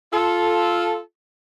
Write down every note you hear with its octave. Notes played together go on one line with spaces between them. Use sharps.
F4 A4